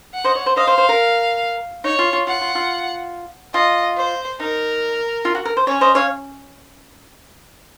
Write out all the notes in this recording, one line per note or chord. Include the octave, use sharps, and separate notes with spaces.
F#5
C5 D#5
C#5
C5
C5 D#5 F5
C5
C5
A#4
D#4 C#5
F4
F4
F4 F#5
F4
F4
F4 D#5
C5
D#4 A#4
F4
F#4
A#4
C5
C#4 C#5
C5 D#5
C#5 F5